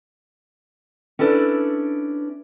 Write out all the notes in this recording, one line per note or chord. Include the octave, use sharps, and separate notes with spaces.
C#4 D4 E4 A4 B4